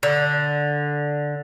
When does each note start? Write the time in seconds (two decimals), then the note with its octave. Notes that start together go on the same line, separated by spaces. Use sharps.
0.03 D3